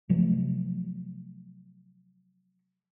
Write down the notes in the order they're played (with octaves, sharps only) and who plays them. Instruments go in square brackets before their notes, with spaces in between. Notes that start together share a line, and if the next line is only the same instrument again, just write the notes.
[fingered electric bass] C3 F3 F#3 A3